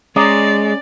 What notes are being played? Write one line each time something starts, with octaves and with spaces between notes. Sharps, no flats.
G#3 C#4 D5 A#5 D6 D#6